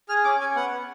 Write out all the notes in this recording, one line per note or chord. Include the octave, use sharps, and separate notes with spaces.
G#4 F6
C#4 D6
C#4 G#5
B3 F#5
B3